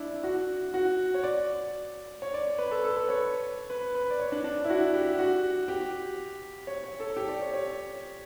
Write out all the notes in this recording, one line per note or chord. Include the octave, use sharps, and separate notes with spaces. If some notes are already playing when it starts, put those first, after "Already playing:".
Already playing: D4 E4
F#4
F#4
C#5
D5
C#5
D5
B4
A4
A4
B4
C#5
B4
B4
D5
C#5
D4
D4
E4
F#4
G4
F#4
G4
C#5
C#5
A4
G4
D5
C#5
C#5